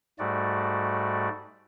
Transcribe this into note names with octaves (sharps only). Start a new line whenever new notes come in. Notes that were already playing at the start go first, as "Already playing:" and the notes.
G#2 G3 A3 F#4 D5